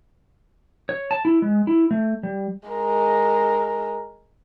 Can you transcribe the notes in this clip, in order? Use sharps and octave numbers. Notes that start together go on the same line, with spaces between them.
C#5
A5
E4
G#3
E4
A3
G3
G#3 A#4